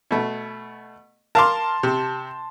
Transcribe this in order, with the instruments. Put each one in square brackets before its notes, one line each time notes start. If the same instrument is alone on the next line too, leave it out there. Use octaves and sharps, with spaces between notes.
[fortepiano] B2 A3
[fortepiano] A#4 F5 D6 [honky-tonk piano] A5 C6
[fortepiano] C3